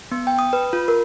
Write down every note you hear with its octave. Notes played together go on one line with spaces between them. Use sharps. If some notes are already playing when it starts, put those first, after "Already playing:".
B3
G5
D#6
B4
F4
A#4